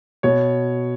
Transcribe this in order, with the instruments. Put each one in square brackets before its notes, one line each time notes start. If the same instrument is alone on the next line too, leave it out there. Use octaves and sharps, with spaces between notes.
[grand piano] B2 C#5